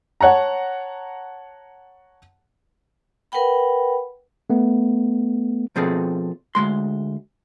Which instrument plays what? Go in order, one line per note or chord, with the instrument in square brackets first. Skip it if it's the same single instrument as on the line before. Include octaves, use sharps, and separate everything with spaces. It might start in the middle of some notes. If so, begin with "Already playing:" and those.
[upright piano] C#5 F#5 A5 A#5
[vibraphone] A#4 B4 F#5 G5 B5
[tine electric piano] A3 B3
[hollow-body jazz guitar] B2 F3 C4 G#4 A4
D2 G#3 C6